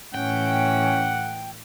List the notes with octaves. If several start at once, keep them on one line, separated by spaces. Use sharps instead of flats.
A2 E3 C#4 F#5 G5